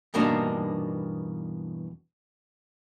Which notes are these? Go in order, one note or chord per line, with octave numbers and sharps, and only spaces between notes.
E2 G2 B2 A#3 D4 D#4